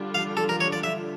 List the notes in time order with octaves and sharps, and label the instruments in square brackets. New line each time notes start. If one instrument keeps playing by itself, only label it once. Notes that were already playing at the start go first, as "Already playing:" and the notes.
Already playing: [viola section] D3 G3 D4 F4
[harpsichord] F5
A4
A#4
C#5
D5
E5